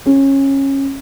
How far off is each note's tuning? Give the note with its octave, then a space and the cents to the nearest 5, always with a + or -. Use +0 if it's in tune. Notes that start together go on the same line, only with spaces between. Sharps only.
C#4 -20